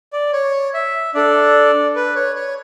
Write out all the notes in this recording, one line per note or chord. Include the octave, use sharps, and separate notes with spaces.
D5
C#5
E5
D4 A4 D5
B4
C#5
C#5